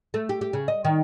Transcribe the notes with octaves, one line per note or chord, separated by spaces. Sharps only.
A3
G4
G4
C#3
D#5
D#3